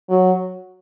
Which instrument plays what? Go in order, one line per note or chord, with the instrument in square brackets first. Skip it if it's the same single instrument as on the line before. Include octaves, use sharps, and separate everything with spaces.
[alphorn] F#3